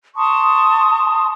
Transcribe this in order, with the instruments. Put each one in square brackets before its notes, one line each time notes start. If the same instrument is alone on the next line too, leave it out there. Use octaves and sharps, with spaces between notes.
[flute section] A5 C6 C#6 D#6